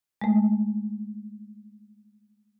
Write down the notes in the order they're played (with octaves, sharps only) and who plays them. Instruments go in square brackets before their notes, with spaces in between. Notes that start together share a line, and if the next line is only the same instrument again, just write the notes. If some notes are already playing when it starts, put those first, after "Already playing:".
[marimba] G#3 A3